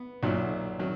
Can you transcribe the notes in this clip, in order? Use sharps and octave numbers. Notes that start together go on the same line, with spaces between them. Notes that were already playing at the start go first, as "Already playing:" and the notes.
Already playing: B3
B1 A#2 F#3
D#3 F#3